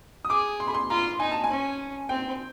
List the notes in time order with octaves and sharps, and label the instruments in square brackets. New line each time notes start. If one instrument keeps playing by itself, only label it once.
[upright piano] D#6
[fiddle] G#4 [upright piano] D6
[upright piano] C6
B5
C6
[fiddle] F4 [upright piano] A#5
[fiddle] D#4 [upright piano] G#5
[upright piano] A5
G#5
[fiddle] C#4
[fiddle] C4 [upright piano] G5